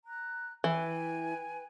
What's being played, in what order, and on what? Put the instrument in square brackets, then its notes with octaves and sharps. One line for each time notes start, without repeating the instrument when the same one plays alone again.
[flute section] A#5 F#6
[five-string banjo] E3 [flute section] B4 G5 G#5